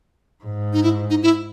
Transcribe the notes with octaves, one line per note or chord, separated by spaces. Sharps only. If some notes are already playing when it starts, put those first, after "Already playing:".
G#2
D#4
E4
D#4
E4